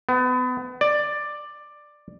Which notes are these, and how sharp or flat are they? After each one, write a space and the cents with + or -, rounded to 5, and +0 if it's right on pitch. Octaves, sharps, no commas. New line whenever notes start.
B3 +30
D5 +10